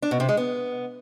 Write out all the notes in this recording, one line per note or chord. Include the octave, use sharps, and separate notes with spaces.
D4
B2
C3
G#3
B3